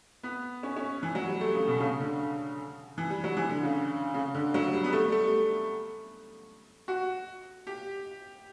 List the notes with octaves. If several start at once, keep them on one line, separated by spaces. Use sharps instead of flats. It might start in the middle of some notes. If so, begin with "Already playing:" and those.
B3
C#4
C#4
E3
F#3
G3
A3
C#3
B2
C#3
D3
E3
G3
F#3
E3
D3
C#3
C#3
D3
F#3
G3
B3
A3
G3
A3
F#4
G4